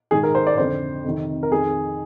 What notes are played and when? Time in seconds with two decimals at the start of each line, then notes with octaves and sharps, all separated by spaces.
0.11 G#2 D#3 G#4
0.23 A#4
0.35 C5
0.47 D5
0.58 F2 D3 C5
1.04 F2 C3 D#3
1.43 A#4
1.51 F2 D#3 G#4